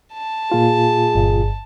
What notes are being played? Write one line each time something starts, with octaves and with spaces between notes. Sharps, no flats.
A5
A#2 F4 G#4
G1